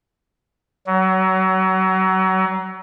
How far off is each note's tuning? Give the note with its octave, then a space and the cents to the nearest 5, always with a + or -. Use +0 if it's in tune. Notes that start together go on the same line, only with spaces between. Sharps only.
F#3 +30